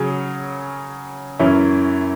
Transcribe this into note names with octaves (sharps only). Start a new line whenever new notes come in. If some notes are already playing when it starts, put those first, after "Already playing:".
Already playing: C#3 F#3 C#4 G#4
F#2 E3 C#4 E4